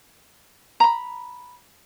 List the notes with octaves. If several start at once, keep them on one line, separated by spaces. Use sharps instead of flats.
A#5 B5